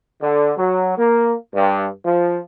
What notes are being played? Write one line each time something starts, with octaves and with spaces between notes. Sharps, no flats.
D3
F#3
A#3
G2
F3